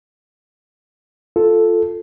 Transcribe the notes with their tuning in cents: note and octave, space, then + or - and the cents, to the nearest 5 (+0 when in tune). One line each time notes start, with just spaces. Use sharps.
F4 +0 A4 +0